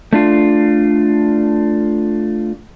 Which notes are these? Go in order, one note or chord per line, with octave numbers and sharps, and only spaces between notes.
A3 D4 F4